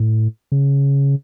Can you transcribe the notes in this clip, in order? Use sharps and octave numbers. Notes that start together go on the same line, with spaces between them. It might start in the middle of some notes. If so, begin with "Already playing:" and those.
Already playing: A2
C#3